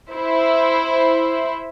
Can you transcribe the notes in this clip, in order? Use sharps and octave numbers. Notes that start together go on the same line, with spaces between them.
E4 C5